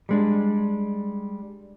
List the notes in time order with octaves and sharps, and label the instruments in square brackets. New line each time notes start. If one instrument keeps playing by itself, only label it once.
[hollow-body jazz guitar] G3 G#3 D4